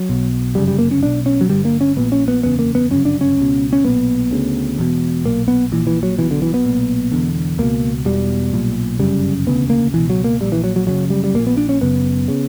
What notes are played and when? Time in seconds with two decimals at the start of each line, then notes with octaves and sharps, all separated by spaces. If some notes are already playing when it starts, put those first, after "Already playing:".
Already playing: F#3
0.09 B1 B2
0.55 G1 F#2 C#3 G3
0.68 G3
0.79 A#3
0.91 C#4
1.02 B1 B2 D4
1.26 C#4
1.41 F#3
1.49 G1 G2 D3 G3
1.65 A#3
1.81 C#4
1.97 A#1 A#2 B3
2.12 C#4
2.28 B3
2.43 F#1 E2 C#3 B3
2.59 A#3
2.75 B3
2.90 G1 F#2 C#3 C#4
3.05 D4
3.21 C#4
3.37 C#2 B2
3.73 C#4
3.84 B1 A#2 B3
4.31 D2 C#3
4.78 E1 E2 B2
5.25 B1 A#2 A#3
5.48 B3
5.72 A#1 A#2 E3
5.87 E3
6.03 F#3
6.18 B1 B2 E3
6.31 D3
6.42 E3
6.54 B3
6.65 B1 A#2
7.12 E1 E2 D3
7.58 C#2 B2 A#3
8.05 E1 E2 B2 G3
8.53 B1 A#2
8.99 G1 F#2 C#3 G3
9.46 E1 D2 C#3 B3
9.70 A#3
9.93 C#2 B2 E3
10.10 F#3
10.24 A#3
10.41 A#1 A#2 G3
10.52 E3
10.64 F#3
10.76 F#3
10.87 F#1 F#2 C#3 F#3
11.10 G3
11.24 G3
11.35 A#1 A#3
11.40 A#2
11.47 B3
11.57 D4
11.69 C#4
11.81 F#1 F#2 C#3 B3
12.28 C#3